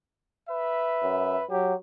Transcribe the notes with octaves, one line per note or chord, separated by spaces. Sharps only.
B4 E5
F#2
F#3 G4